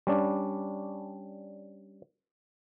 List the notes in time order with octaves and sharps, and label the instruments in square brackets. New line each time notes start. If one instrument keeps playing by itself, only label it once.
[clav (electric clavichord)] G3 C#4 D4